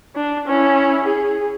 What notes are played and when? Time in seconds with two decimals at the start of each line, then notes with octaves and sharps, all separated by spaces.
0.16 D4
0.47 C#4 E4
1.05 G#4